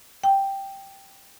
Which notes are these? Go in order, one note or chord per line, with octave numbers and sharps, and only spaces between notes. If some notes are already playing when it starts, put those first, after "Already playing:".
G5